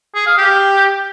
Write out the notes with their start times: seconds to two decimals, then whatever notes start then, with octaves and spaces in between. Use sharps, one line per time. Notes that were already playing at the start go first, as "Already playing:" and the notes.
0.15 G#4
0.26 F5
0.38 G4